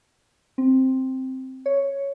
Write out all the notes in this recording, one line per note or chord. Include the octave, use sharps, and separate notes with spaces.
C4
C#5